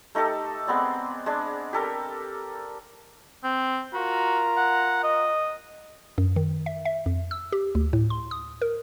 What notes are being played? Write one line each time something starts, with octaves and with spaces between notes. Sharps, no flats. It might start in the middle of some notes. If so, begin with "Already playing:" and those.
A3 D#4 G4 A4
G#3 B3 C4 D5
G#3 D4
G4 A4 A#4
C4
F4 F#4 A#4 A#5
F#5
D#5
F#2
D#3
E5
E5
F2
E6
G4
D2
A2
C6
D#6
A#4